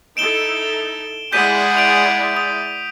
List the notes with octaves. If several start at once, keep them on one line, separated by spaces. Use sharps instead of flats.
D#4 E4 A4 D7 E7 G7
G#3 E4 G#4 D5 F#5 G6 B6 D#7
D7 F7
D#6